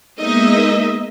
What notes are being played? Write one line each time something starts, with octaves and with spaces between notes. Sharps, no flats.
G#3 A#3 B3 D#4 D#5 E5